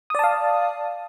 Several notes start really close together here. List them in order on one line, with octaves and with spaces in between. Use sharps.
D#6 D5 A5 F5